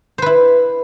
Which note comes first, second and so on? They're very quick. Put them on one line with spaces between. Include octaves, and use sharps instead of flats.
C5 B4 E4